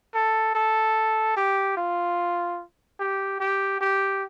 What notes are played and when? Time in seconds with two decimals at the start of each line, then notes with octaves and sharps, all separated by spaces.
0.14 A4
0.55 A4
1.37 G4
1.77 F4
3.00 G4
3.40 G4
3.81 G4